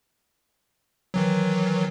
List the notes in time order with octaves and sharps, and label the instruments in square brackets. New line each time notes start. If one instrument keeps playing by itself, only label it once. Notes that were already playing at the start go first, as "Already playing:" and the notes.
[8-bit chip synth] D#3 E3 F#3